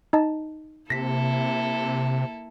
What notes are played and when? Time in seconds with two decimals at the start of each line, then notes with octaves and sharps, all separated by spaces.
0.13 D#4 D#5 A5
0.90 C3 A#3 E4 A4 A#6 B6